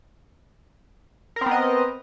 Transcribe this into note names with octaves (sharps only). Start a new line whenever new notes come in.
B3 C4 A#4 D#5